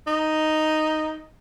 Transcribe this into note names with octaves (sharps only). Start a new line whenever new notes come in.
D#4